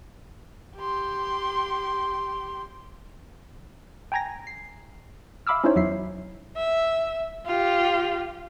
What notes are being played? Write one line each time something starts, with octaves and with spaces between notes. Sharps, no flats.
G4 C6
G5 G#5 A#5 G#6 A#6
C7
E5 F5 B5 D6 E6 F6
C#4 D#4 E4 C5 C#5
E2 F#3 E5 C7
E5
F4 G4